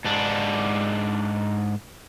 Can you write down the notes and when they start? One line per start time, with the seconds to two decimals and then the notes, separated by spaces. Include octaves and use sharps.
0.05 G#2 D4